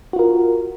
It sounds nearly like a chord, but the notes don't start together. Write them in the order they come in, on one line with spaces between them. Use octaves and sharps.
F#4 F4 A#4